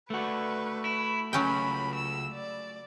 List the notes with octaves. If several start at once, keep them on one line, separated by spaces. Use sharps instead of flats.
A3 F#4 B4
E4
C#2 F#3 C#4 G5 B5
E6
D5